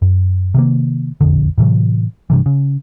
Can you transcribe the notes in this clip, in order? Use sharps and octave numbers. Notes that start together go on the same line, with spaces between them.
F#2
C3 D#3 A#3
E1 A#1 F2 D3
A2 C3 E3 F#3
G2 C3 E3
C#3